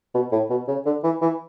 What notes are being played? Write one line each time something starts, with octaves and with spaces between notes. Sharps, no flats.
B2
A2
B2
C#3
D3
E3
E3